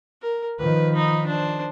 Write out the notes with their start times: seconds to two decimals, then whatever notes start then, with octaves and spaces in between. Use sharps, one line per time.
0.22 A#4
0.59 D#3 F3 B4
0.92 D#4 B5
1.26 D4 C5